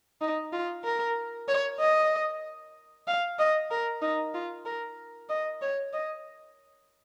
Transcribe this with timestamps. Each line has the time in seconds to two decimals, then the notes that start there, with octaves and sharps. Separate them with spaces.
0.21 D#4
0.52 F4
0.84 A#4
1.48 C#5
1.80 D#5
3.07 F5
3.38 D#5
3.70 A#4
4.01 D#4
4.34 F4
4.65 A#4
5.29 D#5
5.61 C#5
5.93 D#5